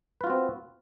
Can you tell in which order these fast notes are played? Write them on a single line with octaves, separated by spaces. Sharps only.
B4 F4 F#4 C4